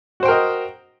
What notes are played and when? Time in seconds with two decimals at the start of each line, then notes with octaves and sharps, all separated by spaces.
0.20 F#4
0.23 C5
0.25 G5
0.28 A#4
0.31 D#5